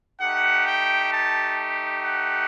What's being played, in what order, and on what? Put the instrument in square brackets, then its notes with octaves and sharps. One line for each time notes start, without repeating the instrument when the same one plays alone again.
[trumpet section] A3 D#4 G4 F#5
G5
A5
F#5